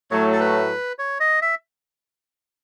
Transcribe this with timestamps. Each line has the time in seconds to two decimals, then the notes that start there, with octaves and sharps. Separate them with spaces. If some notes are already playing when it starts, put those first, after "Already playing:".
0.11 A2 F#3 A3 C#5
0.33 A4
0.40 B4
0.99 C#5
1.20 D#5
1.42 E5